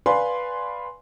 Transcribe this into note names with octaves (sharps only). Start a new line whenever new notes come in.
B4 D5 F5 G#5 B5 C6